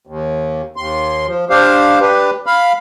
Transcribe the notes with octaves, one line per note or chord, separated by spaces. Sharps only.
D#2
D#2 C6
F3
D4 G4 C5 F5
D4 G4 B4
F5 B5